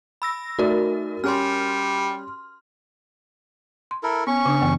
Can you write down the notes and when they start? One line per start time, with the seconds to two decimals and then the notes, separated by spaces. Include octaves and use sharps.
0.22 B5 E6 A#6
0.59 A3 D#4 F#4 A#4 D5
1.24 G3 C#4 G4 C6 F6
3.91 C6
4.03 E4 A4 A#4
4.27 B3 C#4 C#6
4.46 C#3 D4 D#6
4.62 F#2 E3 B3